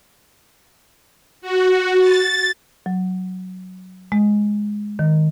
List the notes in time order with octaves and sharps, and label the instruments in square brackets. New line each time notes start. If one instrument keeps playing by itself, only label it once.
[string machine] F#4
A6
[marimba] F#3
G#3
D#3